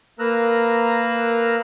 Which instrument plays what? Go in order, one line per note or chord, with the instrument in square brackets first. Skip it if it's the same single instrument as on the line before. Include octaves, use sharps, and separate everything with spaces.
[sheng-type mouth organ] A#3 A#4 B4 A#5 E6 F#6